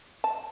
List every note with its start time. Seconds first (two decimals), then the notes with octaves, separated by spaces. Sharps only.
0.24 A5